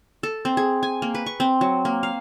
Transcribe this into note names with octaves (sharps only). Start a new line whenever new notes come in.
A4
C4
G#4
G#5
A#3
B4
C#6
C4
F#3
A#3
F5